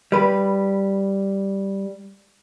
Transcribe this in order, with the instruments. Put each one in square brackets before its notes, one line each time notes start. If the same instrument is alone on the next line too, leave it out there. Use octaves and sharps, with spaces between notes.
[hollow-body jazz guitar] G3 B4